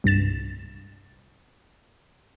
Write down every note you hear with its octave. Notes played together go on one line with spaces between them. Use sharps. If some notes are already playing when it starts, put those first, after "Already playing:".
C2 G2 A6 E7